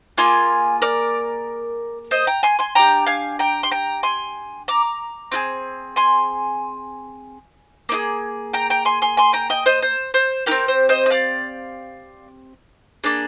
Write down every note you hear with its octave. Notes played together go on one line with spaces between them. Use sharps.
A#3 F4 G#4 G#5 C6
A#4 D5
C5 D#5
G5 A#5
G#5 C6
G#5 C6
D4 G4 G5 A#5
F5 G#5
G5 A#5
C6
G5 A#5
G#5 C6
A#5 D6
C4 F4 G#4
G#5 C6
A#3 D#4 G#4
G5 A#5
G5 A#5
G#5 C6
G#5 C6
G#5 C6
G5 A#5
D#5 G5
C5 D#5
C5
C5
C4 D#4 G4 A#4
C5
C5 D#5
D#5
D5 F5
A#3 D4 G#4